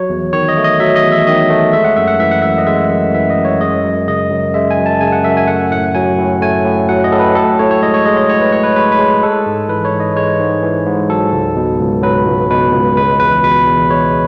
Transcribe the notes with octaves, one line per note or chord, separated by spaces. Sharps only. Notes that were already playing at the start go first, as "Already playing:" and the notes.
Already playing: F#3 C#5
E2
D#3 C#5
D#5
A3
D#5
F#3 E5
D#5
E2
E5
D#3 D#5
A3
G#3 E5
F#5
F#2 E5
F#5
E3 E5
F#5
F#2 E5
D#5
G#3 E5
F#2
E3 E5
D#5
F#2
C#5
G#3 D#5
F#2
C#3 D#5
F#2
G#3 E5
G#5
F#2
A5
C#3 G#5
F#5
F#2 E5
G#5
A3 F#5
A2 F#5
F#3 G#5
A2
A3 G#5
A2
F#3 F#5
D#5
A2 A4
B4
A2 A4
A2 C#5
C#5
G#3 D#5
C#5
G#3 D#5
D#5
A2 C#5
B4
A2 C#5
B4
G#3 B4
B4
G#3
C#5
G#3 A4
G#2
E3 B4
C#5
G#2
D#5
G#3 C#5
G#2
E3
G#2
F#3 A4
C#2
B2
C#2
F#3 B4
C#2
B2 B4
C#2
G#3 B4
E2 B4
B2 B4
E2
G#3 C#5